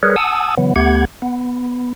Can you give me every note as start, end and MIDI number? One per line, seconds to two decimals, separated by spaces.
0.03 0.16 55
0.03 0.16 68
0.03 0.16 70
0.03 0.16 71
0.03 0.16 73
0.16 0.55 78
0.16 0.55 80
0.16 0.55 81
0.16 0.55 87
0.16 0.55 88
0.58 0.74 49
0.58 0.74 52
0.58 0.74 54
0.58 0.74 59
0.76 1.05 38
0.76 1.05 57
0.76 1.05 59
0.76 1.05 67
0.76 1.05 78
0.76 1.05 92
1.22 1.93 59